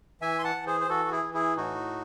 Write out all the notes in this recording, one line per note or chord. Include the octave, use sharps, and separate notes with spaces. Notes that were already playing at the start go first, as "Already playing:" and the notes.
E3 E5 G#5
C6
F#5 A5
E3
G#4 C5
C5
E3 F#4 A4
F#4
E4 G#4
E3
E4 G#4
A2 D#4 F#4